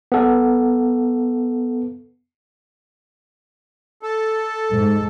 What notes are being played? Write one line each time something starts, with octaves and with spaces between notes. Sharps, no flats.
B3 A4
A4
G#2